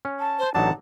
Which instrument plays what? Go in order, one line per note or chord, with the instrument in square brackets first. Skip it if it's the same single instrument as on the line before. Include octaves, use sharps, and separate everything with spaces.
[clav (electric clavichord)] C#4
[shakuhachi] A5
[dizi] C5
[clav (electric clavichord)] A1 F#3 D4 [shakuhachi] D#4 [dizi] F#5 [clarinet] A5